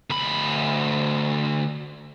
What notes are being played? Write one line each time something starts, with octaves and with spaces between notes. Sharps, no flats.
D2 B5